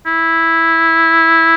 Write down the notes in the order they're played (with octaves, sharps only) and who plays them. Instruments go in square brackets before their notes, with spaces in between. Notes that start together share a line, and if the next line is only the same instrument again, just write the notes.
[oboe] E4